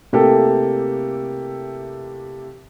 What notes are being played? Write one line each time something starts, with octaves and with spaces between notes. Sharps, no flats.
C3 A3 A#3 E4 G4 A4